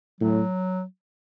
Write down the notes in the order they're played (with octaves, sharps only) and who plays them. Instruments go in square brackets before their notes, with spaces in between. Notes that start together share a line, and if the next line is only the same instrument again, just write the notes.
[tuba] A2 [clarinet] F#3